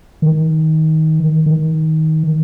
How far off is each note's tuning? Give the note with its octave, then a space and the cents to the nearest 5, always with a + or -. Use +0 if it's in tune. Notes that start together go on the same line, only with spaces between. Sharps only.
D#3 +20
D#3 +20